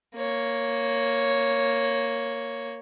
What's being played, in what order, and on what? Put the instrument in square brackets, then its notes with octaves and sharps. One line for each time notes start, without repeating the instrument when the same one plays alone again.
[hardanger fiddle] A#3 C#5